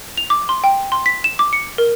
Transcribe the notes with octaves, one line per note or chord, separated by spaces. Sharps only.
F7
D6
C6
G5
C6
B6
E7
D6
C#7
A#4